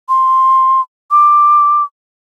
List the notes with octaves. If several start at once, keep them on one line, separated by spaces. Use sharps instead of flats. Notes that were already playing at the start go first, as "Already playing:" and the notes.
C6
D6